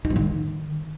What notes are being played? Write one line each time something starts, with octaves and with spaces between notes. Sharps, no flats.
D#4
F3
D#3